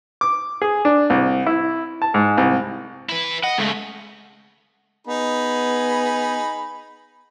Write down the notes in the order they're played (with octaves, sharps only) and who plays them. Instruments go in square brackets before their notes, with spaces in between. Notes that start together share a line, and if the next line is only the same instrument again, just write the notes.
[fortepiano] D6
G#4
D4
C2
E4
A5
G#2
C2
[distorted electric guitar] E4 B4
[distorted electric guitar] D#5 [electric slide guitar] F#5
[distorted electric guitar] C#3 [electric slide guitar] G#3 A3
[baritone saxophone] B3 [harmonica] D#4 G#4 B5